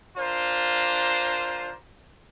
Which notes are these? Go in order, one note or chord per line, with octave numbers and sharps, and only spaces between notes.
D4 F4 A#4 C5